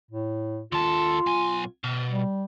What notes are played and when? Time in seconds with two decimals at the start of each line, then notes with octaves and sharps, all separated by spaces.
0.11 A2
0.72 D#2 F4 A4
1.27 B1 G#5
1.84 B2
2.10 G3